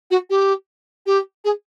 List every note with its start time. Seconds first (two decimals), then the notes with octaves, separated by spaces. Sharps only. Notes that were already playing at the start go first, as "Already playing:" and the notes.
0.10 F#4
0.30 G4
1.06 G4
1.44 G#4